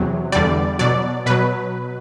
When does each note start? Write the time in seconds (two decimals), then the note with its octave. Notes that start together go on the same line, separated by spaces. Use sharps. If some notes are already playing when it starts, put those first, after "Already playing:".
Already playing: E2 C3 F#3
0.32 E2 D3 G3 D5
0.79 B2 F#3 D5
1.26 B2 F#3 B4